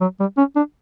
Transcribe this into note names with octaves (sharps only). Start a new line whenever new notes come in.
F#3
G3
C#4
D4